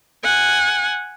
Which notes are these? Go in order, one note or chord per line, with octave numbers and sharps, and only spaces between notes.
F#5 G#5